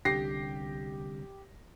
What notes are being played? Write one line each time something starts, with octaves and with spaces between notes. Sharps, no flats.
C2 D3 G4 A#6 C7